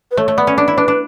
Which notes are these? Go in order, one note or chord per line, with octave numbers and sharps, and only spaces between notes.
B4
A3 C#5
A3
B3 D5
C#4
D4 D5
E4
D4 B4
D4